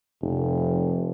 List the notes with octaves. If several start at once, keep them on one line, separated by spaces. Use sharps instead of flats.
F1